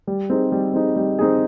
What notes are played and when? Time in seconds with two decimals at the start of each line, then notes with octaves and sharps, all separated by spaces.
0.07 G3
0.30 C4 D#4 G#4
0.52 G3
0.74 C4 D#4 G#4
0.96 G3
1.19 C4 D#4 G#4